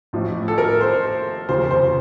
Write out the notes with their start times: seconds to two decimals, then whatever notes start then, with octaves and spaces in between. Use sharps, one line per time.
0.13 A1 A2 F3
0.48 A4
0.58 A#4
0.81 C5
1.49 F1 D#2 C#3 F3 C5
1.71 C5